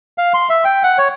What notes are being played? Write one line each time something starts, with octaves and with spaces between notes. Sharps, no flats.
F5
C6
E5
G5
F#5
C#5